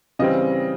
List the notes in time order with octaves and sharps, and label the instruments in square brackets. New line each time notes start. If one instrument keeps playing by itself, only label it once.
[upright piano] C#3 E3 G3 C4 D#5